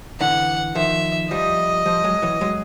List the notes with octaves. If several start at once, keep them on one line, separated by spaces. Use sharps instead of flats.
D3 E3 F#5
D#3 F3 E5
F3 G3 D#5
F3 G3
F#3 G#3
E3 F#3
F#3 G#3